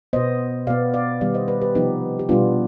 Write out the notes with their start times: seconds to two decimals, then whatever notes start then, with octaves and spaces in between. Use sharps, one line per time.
0.13 B2 B3 C5 D#5
0.67 B2 B3 D5 F5
0.94 D5 F5
1.21 D#3 G3 B3 D5 F5
1.34 C5 D#5
1.48 B4 D5
1.61 G4 B4
1.75 C3 F3 B3 D#4 G4
2.19 G4
2.29 B2 G3 B3 D4 F4